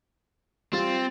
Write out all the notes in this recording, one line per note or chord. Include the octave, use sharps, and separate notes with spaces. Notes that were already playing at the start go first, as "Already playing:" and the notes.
G3 C4 F4 A6